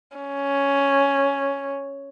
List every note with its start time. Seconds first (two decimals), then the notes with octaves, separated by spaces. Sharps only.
0.17 C#4